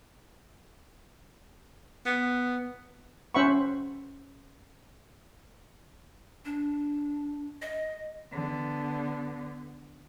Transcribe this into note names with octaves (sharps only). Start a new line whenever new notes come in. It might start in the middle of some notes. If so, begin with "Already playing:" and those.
B3
C#4 C5 E5 F#5 B5 C#6
D4
D#5
D3 B3